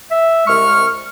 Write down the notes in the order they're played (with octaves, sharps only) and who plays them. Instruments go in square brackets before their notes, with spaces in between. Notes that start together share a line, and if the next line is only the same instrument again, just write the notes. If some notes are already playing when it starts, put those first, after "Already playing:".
[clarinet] E5
[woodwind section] C2 G#3 F6 [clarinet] C#6